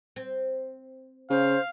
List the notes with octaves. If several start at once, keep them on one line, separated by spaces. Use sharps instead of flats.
C4
C#3 C5 F5